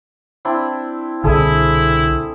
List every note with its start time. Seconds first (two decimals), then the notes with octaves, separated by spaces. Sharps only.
0.45 C4 D4 E4
1.24 C2 B2 D3 E4 G#4 A4